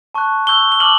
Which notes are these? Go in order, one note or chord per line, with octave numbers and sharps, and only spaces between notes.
A5 C#6 F#6
C#6 E6 G6 G7
G7
A5 D6 F6 F#7